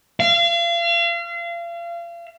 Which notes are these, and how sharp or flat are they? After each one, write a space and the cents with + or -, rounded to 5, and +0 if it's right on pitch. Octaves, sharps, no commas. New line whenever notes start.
F5 -35